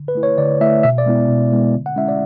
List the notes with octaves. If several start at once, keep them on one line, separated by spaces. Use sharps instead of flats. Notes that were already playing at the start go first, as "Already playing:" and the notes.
Already playing: D3
B4
A3 E4
C#5
D3 D5
A3 E4 E5
B2 E5
D5
G#3 B3 E4
B2
G#3 B3 E4
D3
F#5
G#3 C#4 E4 E5
D5